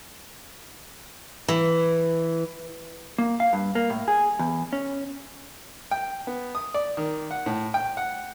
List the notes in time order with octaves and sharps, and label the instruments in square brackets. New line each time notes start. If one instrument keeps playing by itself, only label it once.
[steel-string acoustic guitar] E3
[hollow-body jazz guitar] A#3
F5
G2
A#3
A2
G#4
E2
C#4
[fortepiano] G5
B3
D#6
D5
D#3
F#5
A2
G5
F#5